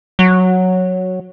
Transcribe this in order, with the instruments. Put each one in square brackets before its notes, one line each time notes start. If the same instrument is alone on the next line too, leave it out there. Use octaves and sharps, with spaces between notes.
[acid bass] F#3